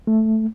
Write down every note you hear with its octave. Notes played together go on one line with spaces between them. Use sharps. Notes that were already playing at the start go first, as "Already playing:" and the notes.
A3